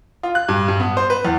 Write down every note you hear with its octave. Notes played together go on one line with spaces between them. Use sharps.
F4
F#6
G2
G2
B3
C5
B4
E2